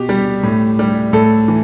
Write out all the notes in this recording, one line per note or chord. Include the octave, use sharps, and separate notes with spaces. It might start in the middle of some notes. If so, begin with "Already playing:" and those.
Already playing: B2 G4
G3
A2
G3
A2 A4
E3